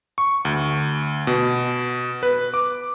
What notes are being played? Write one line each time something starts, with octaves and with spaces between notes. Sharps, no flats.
C#6
D2
B2
B4
D6